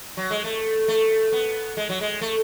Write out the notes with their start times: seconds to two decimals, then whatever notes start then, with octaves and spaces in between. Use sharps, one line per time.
0.17 F#3
0.30 G#3
0.44 A3
0.88 A3
1.32 B3
1.77 G#3
1.89 F#3
2.01 G#3
2.21 A3